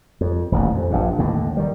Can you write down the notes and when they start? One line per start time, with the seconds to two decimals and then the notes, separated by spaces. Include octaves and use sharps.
0.21 F2
0.52 D#1 A1 D#2
0.74 F2
0.91 A#1 G2
1.19 D#2 A2 D3
1.57 D#3 G3